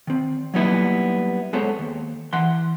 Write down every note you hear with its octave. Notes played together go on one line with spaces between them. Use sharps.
D#3 C4
F#3 G3 A#3 B3 D#4 E4
G#3 B3 A4 C5 C#5
D#2
E3 F#5 C6